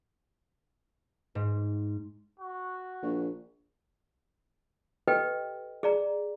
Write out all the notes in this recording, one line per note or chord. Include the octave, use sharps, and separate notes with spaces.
G#2
F#4
A#1
G4 A4 B4 D#5 G5
G#4 D5 A#5